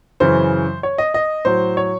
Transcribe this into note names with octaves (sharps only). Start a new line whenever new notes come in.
F#2 C#3 E3 C5
C#5
D#5
D#5
A2 F#3 C5
C#5